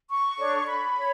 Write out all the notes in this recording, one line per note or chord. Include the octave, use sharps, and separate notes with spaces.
C#6
D4 A4 C#5
B5
C#5